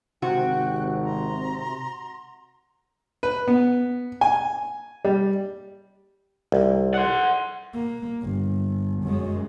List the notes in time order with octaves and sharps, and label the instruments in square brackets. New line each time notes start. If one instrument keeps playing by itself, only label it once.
[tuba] G#1 [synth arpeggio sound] C3 [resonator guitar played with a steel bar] F#4 [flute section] G5 F#6
[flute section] A#5 C6
[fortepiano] B4
B3
G#5
G3
[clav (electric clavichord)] C2
[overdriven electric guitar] F#5 C6
[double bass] A#3
G1
F#2 G#3